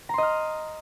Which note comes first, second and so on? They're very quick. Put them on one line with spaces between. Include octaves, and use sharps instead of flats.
A#5 C6 D#5 F6